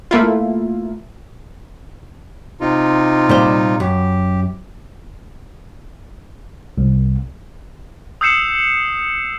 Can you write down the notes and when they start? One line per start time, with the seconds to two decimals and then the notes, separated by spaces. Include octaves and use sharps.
0.11 A3 A#3 E4 F4
2.60 C3 D#4 F4
3.29 A#2 G3 C5
3.80 F#2 G4
6.78 C2
8.21 D#6 E6 G6 C7 C#7 E7